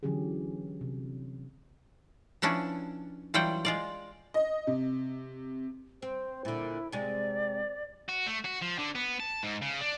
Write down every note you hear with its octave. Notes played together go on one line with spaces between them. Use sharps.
D3 E3 F#3 C#4 G4 G#4
C3
F3 B3 C#4 D4 E4
E3 F#3 G3 F4 F#5 G5
G#3 F4 D5
D#5
C3
C4 C5
A#2 D3 E4
C3 G#3 D5
F#4
A3
F#4
F3
D3
B3
A5
G#2
C#3
D4